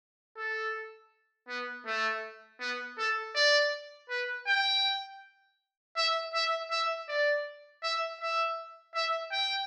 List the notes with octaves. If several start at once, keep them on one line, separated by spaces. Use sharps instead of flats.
A4
B3
A3
B3
A4
D5
B4
G5
E5
E5
E5
D5
E5
E5
E5
G5